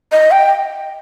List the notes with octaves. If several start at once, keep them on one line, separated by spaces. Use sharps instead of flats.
D#5
G5